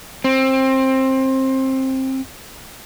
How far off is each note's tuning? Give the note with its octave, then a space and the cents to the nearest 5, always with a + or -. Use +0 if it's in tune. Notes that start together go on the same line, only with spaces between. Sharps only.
C4 +20